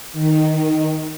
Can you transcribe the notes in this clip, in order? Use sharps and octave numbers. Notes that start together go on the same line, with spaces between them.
D#3